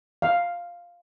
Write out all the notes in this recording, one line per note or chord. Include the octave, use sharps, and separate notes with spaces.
F5